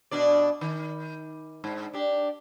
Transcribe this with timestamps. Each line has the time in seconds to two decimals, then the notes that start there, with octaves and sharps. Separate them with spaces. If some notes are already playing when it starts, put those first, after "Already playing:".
0.11 B2 D4 D5
0.61 D#3
1.64 G#2
1.94 D4 G4